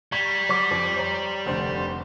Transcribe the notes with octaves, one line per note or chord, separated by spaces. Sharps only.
G3 A#5 C#6 G#6
F#3 C#6 D6
F2
C5 C#5 A#5
F1 D2 C5